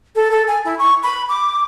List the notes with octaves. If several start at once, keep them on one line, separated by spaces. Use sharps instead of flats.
A4
A4
G#5
E4
C#6
B5
D6